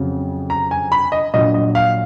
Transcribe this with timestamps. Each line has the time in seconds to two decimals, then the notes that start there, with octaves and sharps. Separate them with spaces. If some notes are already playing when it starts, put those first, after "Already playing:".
Already playing: F2 C#3 F#3
0.50 A#5
0.71 G#5
0.92 B5
1.12 D#5
1.34 A#1 A#2 F#3 D#5
1.54 D#5
1.75 F5